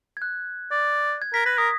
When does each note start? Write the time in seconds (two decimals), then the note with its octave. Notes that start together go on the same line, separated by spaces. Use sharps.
0.17 G#6
0.22 F#6
0.71 D5
1.22 G#6
1.33 A#4 B6
1.46 B4 A#6
1.58 A#4 D#6